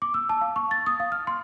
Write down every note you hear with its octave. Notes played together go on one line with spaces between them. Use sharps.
D6
E6
A5
F5
C#6
A6
D#6
F5
F6
C6